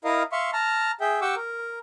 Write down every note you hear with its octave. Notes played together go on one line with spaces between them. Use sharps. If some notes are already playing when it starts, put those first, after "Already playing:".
E4 A#4 D#5 F5
E5 F5 C6 C#6
A5 A#5 F6
G#4 E5 G5
G4 F#5 G5 C#6 D6 E6
A#4